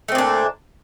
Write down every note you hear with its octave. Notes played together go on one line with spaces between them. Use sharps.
A#2 A3 C4 D4